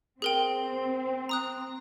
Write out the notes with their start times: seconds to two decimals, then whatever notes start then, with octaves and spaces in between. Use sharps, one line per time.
0.22 C4 G#4 A#4 G5
1.29 A#5 D#6 F#6